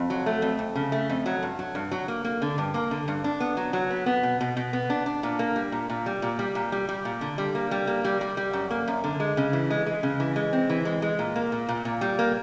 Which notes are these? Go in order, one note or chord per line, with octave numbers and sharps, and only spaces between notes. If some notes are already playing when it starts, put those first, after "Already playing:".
Already playing: F2
F#3
A3
F2
F2
C#3
A3
F2
F#3
G2
F#3
G2
F#3
A#3
A#3
D3
G2
A#3
D3
G2
D4
B3
F#3
F#3
B3
B3
B2
B2
B2
B3
D4
D4
A#2
A#3
G3
A#2
A#2
G3
A#2
G3
A#2
G3
G3
A#2
D3
G3
A#3
G3
A#3
G3
G3
G3
F#2
A#3
F#2
D3
G#3
C#3
E3
G#3
G#3
C#3
E3
G#3
C4
E3
G#3
G#3
A#2
A#3
A#2
A#2
A#2
G3
A#3